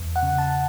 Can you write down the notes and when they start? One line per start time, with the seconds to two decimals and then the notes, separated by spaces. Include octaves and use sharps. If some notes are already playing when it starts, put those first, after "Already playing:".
Already playing: E2
0.16 F#5
0.23 C#3
0.38 A5